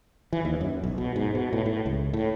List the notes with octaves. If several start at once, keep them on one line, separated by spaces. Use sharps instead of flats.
E3
D#2
F#2
B1
B2
G#2
B2
A2
A2
C#2
A2